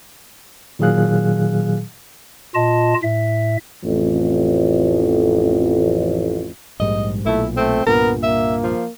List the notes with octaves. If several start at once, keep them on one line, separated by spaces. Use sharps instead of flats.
A#2 D#3 F#3 G#4 F5 F#6
A#2 F4 D#5 A5
A2 E5
A1 F2
A#1 G#2 G3 D#5
B1 A#2 A3 E4
A3 C4
C2 G2 A#2 B3 A#4
A#3 E5
F3